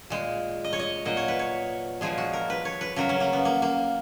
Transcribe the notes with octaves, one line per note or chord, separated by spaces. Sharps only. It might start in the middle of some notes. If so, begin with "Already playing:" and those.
A#2 G#3
D#5
C#5
D#5
A#2 F#3 D#5
C#5
B4
C#5
A#2 F3 G#3 G#4
F#4
A#4
B4
C#5
B4
C#3 F#3 A#4
C#4
A#3
B3
A#3
A#3